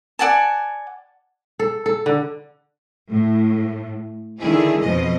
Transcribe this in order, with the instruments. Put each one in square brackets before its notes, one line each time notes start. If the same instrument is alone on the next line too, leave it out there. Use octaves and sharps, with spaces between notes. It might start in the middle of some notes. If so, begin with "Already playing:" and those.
[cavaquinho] D5 F#5 G#5 A5
[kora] A4
A4
D3
[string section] A2
D3 D#3 E4 G#4
F2 B2 F3 D#5